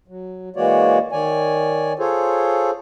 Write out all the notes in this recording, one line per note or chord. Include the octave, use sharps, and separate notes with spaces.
F#3
E3 G#3 A#3 F#4 C#5 D5
D#3 C#5 D5 G#5
F4 G#4 A4 C5 C#5